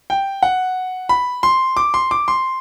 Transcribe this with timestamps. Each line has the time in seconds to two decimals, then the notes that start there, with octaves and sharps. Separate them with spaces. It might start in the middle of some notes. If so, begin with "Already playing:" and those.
0.10 G5
0.43 F#5
1.09 B5
1.43 C6
1.77 D6
1.94 C6
2.11 D6
2.28 C6